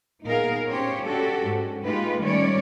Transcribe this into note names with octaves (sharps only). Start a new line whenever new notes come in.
A#2 B3 D#4 G#4 A#4 F5
C#4 G4 C5 C#5
C#4 D4 F#4 G4 A4
G#2 C#4
G#3 A#3 D#4 F4 G4 B4
D#3 G3 A3 C#4 C#5 D5